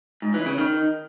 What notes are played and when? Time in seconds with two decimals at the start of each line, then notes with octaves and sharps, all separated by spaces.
0.22 G#2
0.34 E3
0.46 C#3
0.58 D#3